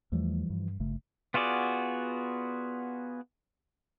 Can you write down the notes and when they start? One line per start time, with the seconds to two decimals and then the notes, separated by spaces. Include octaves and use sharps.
0.12 E2 E3 F3 G3 A3
0.50 G2
0.80 G1 C#3 A3
1.34 B3 F4 F#4 G#4 D5